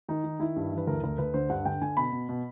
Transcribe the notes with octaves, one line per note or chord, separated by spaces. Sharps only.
D#3 D#4
D#3
D#3 E4
G2
E3
B4
D2 A#4
D2 A#4
D2 B4
D3 C5
G2 F#5
D3 G5
D3 G#5
B2 B5
B2
B2